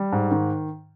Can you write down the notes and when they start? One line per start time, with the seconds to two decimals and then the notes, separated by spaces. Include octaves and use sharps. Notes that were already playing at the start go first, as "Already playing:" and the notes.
Already playing: G3
0.12 G#2
0.31 D#3